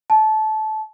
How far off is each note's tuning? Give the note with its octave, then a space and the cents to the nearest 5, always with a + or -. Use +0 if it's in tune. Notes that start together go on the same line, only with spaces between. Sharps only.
A5 -20